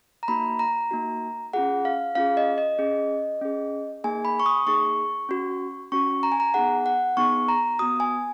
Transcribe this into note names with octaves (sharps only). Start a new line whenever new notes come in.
A#5
A#3 D#4 F#4 B5
A#5
A#3 D#4 F#4
C#4 F4 G#4 F#5
F5
C#4 F4 G#4 F5
D#5
D#5
C#4 G#4
C#4 G#4
A#3 D#4 G#4 G#5
B5
C#6
D#6
A#3 D#4 G#4 C#6
C#4 F#4
C#4 F#4 C#6
A#5
G#5
A#5
B3 D#4 G#4 F#5
F#5
B3 D#4 G#4 C#6
A#5
B3 F#4 D#6
G#5